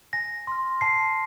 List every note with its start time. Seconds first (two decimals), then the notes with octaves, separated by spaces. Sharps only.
0.13 G#5 A#6
0.47 C6 F6
0.81 A5 C7